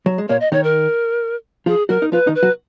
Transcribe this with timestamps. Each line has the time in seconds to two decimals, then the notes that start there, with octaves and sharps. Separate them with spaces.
0.06 F#3
0.18 G#3
0.29 A#2 A#3 C#5
0.41 D#5
0.52 D#3 D#4 C#5
0.64 A#4
1.66 F3 F4 G#4
1.89 F#3 F#4 A#4
2.02 D#4
2.12 F3 F4 B4
2.27 D#3 D#4
2.35 B4
2.43 F#3 F#4